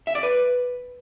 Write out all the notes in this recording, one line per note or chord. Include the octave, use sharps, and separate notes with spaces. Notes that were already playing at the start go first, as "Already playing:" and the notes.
E5
D5
B4